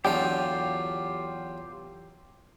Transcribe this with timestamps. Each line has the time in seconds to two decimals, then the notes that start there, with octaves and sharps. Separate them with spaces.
0.05 E2 D3 F#3 C#4 F4 G4 A4 G5